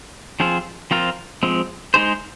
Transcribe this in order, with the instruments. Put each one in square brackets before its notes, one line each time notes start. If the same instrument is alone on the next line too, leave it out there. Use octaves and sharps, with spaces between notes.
[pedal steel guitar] F3 C4 F4 G#4 C5
F3 C4 F4 A#4
F3 G#3 C4
G#3 D#4 G#4 C5